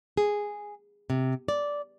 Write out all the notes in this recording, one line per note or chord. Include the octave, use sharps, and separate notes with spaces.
G#4
C3
D5